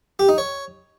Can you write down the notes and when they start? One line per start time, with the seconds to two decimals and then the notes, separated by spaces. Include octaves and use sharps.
0.19 G4
0.29 D#4
0.38 C#5